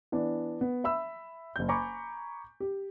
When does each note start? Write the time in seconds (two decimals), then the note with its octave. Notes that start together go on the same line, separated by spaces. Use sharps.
0.12 E3 B3 D4
0.61 B3
0.84 E5 B5 E6
1.56 F#1 G6
1.69 G#5 A#5 B5 C#6 D6
2.60 G4